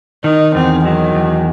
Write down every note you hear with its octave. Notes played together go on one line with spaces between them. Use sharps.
D#3 D#4
E2 C4
D#3 F#3
E2